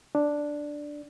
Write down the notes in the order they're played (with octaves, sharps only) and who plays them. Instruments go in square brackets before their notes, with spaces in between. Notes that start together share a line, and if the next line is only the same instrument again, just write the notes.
[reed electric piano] D4